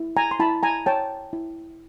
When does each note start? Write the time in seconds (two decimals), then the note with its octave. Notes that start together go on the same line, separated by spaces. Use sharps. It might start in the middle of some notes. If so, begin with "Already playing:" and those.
Already playing: E4
0.17 G#5 A#5
0.31 C6
0.39 E4 A5 B5
0.63 G#5 A#5
0.86 C#5 G5 A5
1.33 E4